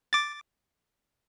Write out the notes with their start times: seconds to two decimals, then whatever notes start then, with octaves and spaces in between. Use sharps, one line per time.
0.13 D6 A6